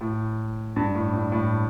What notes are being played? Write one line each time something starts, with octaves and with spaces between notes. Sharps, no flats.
A2
G2
A2
G2
A2